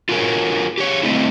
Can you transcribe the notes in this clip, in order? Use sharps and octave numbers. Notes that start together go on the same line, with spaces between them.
F4 F#4 G#4 A#4 C#5
G4 G#4 C#5
A3 C4 D#4 E4